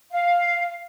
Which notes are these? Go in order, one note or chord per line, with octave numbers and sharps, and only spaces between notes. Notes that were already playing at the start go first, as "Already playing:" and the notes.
F5